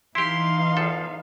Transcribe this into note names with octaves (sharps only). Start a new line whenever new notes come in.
E3 D#4 E4 G4 F5 C6
E2 F3 A4